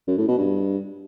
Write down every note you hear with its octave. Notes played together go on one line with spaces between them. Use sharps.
F#2
A2
B2
G2